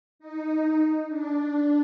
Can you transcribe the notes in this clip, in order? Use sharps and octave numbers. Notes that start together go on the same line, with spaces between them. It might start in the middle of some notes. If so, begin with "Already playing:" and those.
D#4
D4